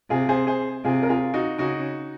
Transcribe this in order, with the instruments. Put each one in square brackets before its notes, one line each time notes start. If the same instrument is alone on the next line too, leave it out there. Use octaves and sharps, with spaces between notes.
[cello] C3 [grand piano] F4 G#4
[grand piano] G#4 C5
G#4 C5
[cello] C3 [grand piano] F4 G#4
[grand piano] A#4
F4 G#4
D#4 F#4
[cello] C#3 [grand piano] D#4 F#4